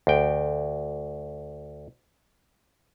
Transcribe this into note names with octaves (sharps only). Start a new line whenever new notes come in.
D2 G5